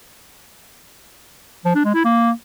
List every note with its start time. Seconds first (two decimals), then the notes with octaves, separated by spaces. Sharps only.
1.65 F3
1.75 D4
1.85 G#3
1.95 E4
2.04 A#3